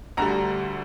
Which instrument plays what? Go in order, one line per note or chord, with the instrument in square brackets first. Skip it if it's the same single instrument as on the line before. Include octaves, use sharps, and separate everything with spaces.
[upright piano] D2 D3 G3 A#5